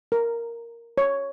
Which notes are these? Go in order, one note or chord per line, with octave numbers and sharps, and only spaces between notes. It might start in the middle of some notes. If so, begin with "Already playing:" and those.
A#4
C#5